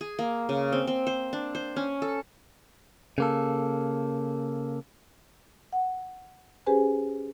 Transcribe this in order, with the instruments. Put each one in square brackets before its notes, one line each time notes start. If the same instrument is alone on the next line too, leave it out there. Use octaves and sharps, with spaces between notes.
[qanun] G#4
A#3
C#3
C4
C4
C5
D4
C5
C#4
A4
[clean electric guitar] C#3 A#3 A4
[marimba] F#5
C#4 G4 G#4 B4 C5 G#5